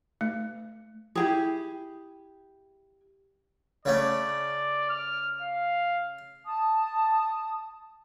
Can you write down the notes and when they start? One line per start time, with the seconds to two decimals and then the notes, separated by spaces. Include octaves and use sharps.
0.21 A3
1.15 E4 G4 G#4
3.85 C#3 A3 C#4 D5
4.90 F6
5.42 F5
6.46 A5 D#6